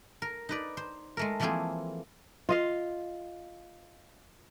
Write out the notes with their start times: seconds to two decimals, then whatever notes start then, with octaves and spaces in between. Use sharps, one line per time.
0.22 A#4
0.49 D#4 B4 D5
0.77 C5
1.17 G#3 A3 A#4
1.40 E3 F3 A3 A#3 C4 G#4
2.49 F4 D#5 F5